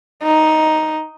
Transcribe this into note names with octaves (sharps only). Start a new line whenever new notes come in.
D#4